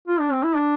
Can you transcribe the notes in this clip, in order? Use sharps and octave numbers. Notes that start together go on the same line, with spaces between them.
F4
D4
C4
E4
D4